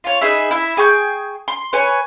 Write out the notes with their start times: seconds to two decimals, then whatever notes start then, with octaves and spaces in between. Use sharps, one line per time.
0.04 F4 C#5
0.21 D#4 G#4 B4 E5
0.51 E4 E5
0.77 G#4 G5 C#6 G6
1.48 C6
1.73 B4 C#5 G#5